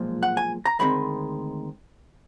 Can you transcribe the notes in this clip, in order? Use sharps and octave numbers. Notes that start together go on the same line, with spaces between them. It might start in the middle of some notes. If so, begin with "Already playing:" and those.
Already playing: B1 A#2 F3 G#3
F#5
G#5
A#5
D2 C3 D#3 G#3 C4 B5